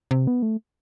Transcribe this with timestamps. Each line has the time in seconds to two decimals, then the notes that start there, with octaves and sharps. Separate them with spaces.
0.11 C3
0.27 B3
0.42 A3